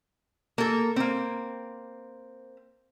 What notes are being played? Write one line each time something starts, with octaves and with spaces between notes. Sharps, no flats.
A#3 A4
A#3 C4